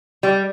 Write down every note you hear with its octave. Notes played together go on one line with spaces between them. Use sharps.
G3